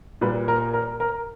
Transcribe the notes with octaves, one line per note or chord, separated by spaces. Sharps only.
A#2 G3 B4
A#4
A#4
A#4